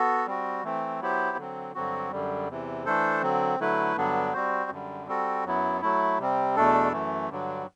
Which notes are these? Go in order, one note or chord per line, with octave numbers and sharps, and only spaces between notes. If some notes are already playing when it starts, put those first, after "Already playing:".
Already playing: B3 F#4 A4
G3 C4 F#4
E3 A3 C4
F#3 B3 E4 G4 C5
D3 F#3 C4
G2 D3 F#3 C4 F#4
F#2 D3 G3
E2 C3 E3
E3 A3 D4 A4 C5
D3 F#3 C4
D3 F#3 A3 E4 B4
G2 D3 F#3 B3 D4
G3 C4 F#4 C5
F#2 D3 G3
G3 C4 F#4 A4
F#2 F#3 B3 E4
F#3 A3 E4
C3 G3 C4
E2 B2 A3 D4 A4
F#2 E3 A3
G2 D3 F#3